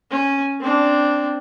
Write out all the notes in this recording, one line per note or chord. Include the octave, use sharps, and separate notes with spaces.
C#4
C4 D4